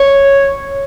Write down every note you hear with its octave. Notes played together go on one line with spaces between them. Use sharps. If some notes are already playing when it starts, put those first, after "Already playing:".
Already playing: C#5